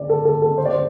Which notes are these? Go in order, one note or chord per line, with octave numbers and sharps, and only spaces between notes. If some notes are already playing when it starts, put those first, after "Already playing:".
Already playing: D5
A4
A4
A4
C5
D5
C5